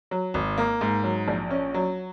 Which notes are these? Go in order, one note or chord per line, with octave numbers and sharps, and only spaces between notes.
F#3
G#1
A#3
G#2
F#3
A#1
C#4
F#3